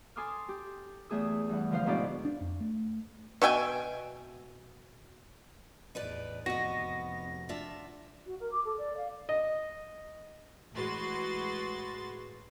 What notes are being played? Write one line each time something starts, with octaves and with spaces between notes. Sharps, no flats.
A4 G#5 C6 D6 D#6 F6
G4
E2 A3 G#4 D#6 E6
G2 E3 F#5
D3 F3 C5 F5
G#2 B2 D4 E4 C5 D5
D4
F2
A3
B2 E5 G5 G#5
A1 E2 D#4 B4 D5
F1 B3 F#4 D#5 A#6
D4 F4 E5
F#4
A#4
D6
A4
D5
F5
D#5
A1 G#3 F#4 B4 C6 A6